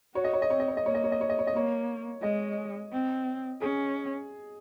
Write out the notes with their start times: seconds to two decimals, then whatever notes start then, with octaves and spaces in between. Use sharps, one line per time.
0.15 F#4 C#5
0.24 D#5
0.33 C#5
0.42 D#5
0.49 C4 C#5
0.60 D#5
0.68 C#5
0.77 D#5
0.85 A#3 C#5
0.95 D#5
1.04 C#5
1.12 D#5
1.21 C#5
1.29 D#5
1.39 C#5
1.47 D#5
1.54 A#3 C#5
2.22 G#3 D#5
2.92 C4
3.61 C#4 G#4